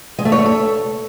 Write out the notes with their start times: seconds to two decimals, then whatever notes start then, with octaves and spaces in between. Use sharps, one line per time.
0.18 G#3
0.25 A3
0.32 C#5
0.39 A3
0.45 A4